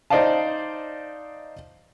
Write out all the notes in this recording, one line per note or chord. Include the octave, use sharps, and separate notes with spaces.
D#4 C5 D5 D#5 F5 A5